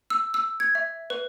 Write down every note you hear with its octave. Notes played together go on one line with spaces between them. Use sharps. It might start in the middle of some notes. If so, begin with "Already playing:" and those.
E6
E6
G#6
E5
B4